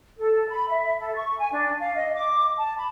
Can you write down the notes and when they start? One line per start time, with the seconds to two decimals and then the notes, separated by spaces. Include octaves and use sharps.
0.18 A4
0.49 B5
0.69 E5
1.00 A4
1.15 C#6
1.39 G#5
1.52 D4
1.80 F5
1.96 D#5
2.15 D6
2.57 A5
2.77 B5